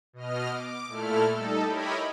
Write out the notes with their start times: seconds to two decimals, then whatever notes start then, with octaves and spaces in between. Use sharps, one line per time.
0.13 B2 D#5 F6
0.49 D6
0.87 A#2 A3 E4 A4 F6
1.34 G3 D#4 A4
1.67 E4 G4 A#4 C#5 D#5 B5